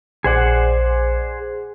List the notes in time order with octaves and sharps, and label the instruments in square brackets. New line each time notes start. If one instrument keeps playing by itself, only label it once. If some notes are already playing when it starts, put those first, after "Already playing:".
[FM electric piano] A#1 D5 D6 [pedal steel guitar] G#4 C5 F#5